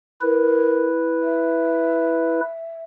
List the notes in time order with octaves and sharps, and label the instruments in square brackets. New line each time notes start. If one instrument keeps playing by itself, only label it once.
[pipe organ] E4 B4 [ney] A#4
[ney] E5